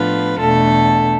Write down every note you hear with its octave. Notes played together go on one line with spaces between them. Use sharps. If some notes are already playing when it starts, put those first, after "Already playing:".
Already playing: A2 F3 B3 D4 F4 B4
E2 B2 A3 D4 A4